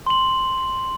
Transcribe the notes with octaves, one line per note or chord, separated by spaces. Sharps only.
C6 F#7